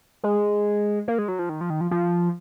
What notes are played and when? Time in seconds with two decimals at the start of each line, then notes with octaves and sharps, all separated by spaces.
0.24 G#3
1.08 A#3
1.19 G#3
1.28 F#3
1.39 F3
1.49 D#3
1.61 F3
1.70 D#3
1.81 F3
1.91 F3